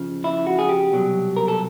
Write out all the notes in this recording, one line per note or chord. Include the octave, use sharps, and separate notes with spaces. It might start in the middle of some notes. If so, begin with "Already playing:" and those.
Already playing: F2 C#3 F3
E4
F#4
G#4
G4
C2 B2 F#3
A#4
A4